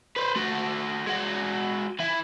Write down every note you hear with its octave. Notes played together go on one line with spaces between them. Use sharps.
B4 C5
A3 F#4
G#3 F#4
E3 E4